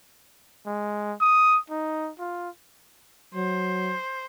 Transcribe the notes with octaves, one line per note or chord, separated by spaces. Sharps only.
G#3
D#6
D#4
F4
F#3 C5